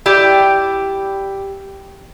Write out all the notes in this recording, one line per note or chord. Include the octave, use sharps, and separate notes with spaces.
E4 G4 D5 G5